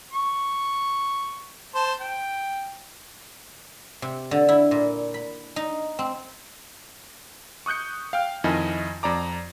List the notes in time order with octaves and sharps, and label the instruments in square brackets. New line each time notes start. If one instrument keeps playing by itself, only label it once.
[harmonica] C#6
C5 A5
G5
[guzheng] C3
D3
E4
A#2
B5
D#4
C4
[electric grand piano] C#6 D#6 F#6 G6 C#7
F5 G5 F6
F2 D#3 E4 D#5 G#5
F2 D5 A#5 D6